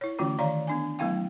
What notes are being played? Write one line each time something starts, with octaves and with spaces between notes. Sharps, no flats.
E4 C#5
D3 E3 A3 C#4 F4 F#4
D#3 C#5 D5 F5 A#5
B3 D4 G#5
F#3 A3 B3 E4 F5 G5